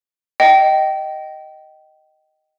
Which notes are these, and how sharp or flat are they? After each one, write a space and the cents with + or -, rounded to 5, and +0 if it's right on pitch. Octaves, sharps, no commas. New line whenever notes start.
D#5 +0 G5 -20